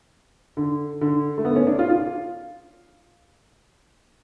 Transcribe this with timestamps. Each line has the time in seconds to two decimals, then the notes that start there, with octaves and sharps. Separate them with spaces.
0.57 D3
1.01 D3
1.38 A3
1.45 B3
1.56 C#4
1.67 D4
1.79 F4
1.90 F4